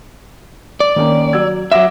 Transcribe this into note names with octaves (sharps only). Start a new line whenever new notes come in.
D5
D#3 A#3 C#4
F#3 E6 G#6
F#3 E5 F#5 D6 A#6